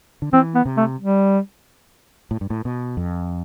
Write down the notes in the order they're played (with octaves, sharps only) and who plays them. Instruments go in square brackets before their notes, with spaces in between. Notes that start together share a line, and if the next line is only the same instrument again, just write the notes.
[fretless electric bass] D3
[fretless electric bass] E3 [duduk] C4
[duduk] B3
[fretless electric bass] C3
[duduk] A3
G3
[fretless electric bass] A2
G2
A2
B2
F2